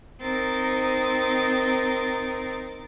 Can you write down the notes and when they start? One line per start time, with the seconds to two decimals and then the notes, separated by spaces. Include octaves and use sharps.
0.21 C4 D#4 A#4 A6